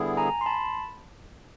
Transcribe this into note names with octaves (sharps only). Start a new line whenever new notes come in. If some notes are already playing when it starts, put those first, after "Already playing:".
Already playing: D3 G3 B3 E4 G#4
G#5 A#5
C6
A5 B5